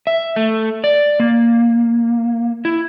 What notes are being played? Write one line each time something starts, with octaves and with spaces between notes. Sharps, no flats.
E5
A3
D5
A#3
E4